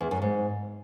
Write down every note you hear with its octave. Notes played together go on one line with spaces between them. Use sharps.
E2
F#2
G#2